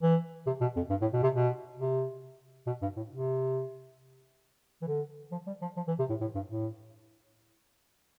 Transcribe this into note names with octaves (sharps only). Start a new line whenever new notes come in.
E3
C3
B2
F2
G2
A2
B2
C3
B2
C3
B2
G2
A2
C3
E3
D3
F3
G3
F3
F3
E3
C3
A2
A2
G2
A2